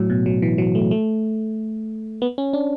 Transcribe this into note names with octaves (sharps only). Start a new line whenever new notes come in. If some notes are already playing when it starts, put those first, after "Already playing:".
Already playing: A2 F#3
B2
F#3
E3
F#3
A3
A3
B3
C#4
D4